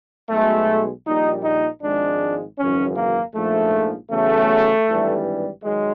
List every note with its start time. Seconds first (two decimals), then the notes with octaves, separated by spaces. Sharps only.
0.29 B1 B2 G#3 A3
1.06 A#1 A#2 G3 D#4
1.44 D#4
1.82 G#1 G#2 F3 G#3 D4
2.58 G#1 F#2 C#3 E3 C#4
2.96 A#3
3.35 A#1 G#2 F3 A3
4.10 E2 C#3 F#3 A3
4.87 G#1 G2 E3 G3
5.63 D#3 F#3 G#3